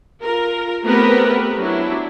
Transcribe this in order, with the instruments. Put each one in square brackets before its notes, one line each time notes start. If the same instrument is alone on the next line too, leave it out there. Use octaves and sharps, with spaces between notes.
[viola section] F4 A#4
A3 B3 C4 G4 A#4 B4
F#3 D4 E4